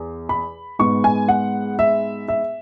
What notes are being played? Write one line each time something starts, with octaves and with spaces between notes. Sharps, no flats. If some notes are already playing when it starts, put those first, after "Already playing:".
Already playing: E2
B5
G#2 G#3 B3 C#6
G#5
F#5
E5
E5